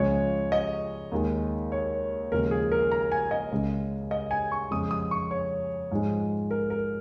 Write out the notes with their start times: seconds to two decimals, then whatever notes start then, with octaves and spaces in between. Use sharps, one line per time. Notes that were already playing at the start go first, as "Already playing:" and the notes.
Already playing: C#2 C#3 F3 G#3 C#5
0.52 D#5
1.12 D#2 D#3 G#3
1.72 C#5
2.32 D#2 C#3 F3 G#3 A#4
2.51 G#4
2.72 A#4
2.91 A#5
3.12 G#5
3.31 D#5
3.52 C#2 C#3 G#3
4.11 D#5
4.31 G#5
4.52 C#6
4.71 F2 C#3 G#3 D#6
4.91 D#6
5.11 C#6
5.31 C#5
5.91 G#2 F3 G#3
6.51 A#4
6.70 A#4